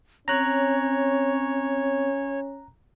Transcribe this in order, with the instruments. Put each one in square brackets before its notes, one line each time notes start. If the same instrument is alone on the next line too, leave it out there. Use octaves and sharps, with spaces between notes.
[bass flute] C4 [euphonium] C#4 [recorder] C#5 [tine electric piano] A#5 F#6